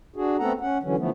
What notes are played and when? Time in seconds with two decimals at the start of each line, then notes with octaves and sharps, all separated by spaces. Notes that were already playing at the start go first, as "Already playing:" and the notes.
0.16 D4 F#4 G#4
0.39 A3 B3 C4 A4 F#5 A#5
0.61 C#4 F#5
0.83 D3 E3 F#3 C#4
0.98 D3 E3 F3 A3 B3